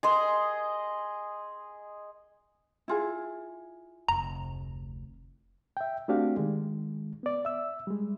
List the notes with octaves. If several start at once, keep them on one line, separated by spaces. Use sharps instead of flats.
G#4 D#5 C6
E4 F4 G#4
F1 D2 A#5
E5 G5
A3 C4 D4 F#4 G4 F5
D#3 G#3
B3 D5
E5 E6
G3 G#3